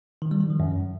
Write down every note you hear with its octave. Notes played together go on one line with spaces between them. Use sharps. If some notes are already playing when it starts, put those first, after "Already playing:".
D#3
G3
D#3
F3
F#2